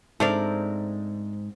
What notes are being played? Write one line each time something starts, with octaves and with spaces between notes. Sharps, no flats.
G#2 A3 C4 D4 A#4 D5